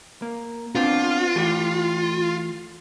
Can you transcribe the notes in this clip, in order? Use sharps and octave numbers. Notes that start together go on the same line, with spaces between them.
A#3
B3 C4 D4 F4
E3 A3 G4